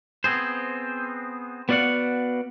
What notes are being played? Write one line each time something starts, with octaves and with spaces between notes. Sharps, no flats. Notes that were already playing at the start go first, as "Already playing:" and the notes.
B3 C4 G#4 C5
B3 F#4 D5 F5 F#5